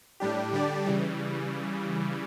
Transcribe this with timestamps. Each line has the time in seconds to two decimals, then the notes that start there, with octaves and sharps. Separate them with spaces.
0.20 A2 G3 D4 G4
0.53 D3 G3 D4 G4 D5
0.86 C#3 E3 G3